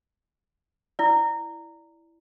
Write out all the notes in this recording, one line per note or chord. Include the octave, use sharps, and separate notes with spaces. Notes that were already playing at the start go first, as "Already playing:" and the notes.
E4 D5